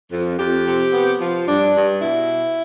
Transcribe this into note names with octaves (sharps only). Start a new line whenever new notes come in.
F2
F2 G4
C3
B3
F3
G2 D4
G2
B2 E4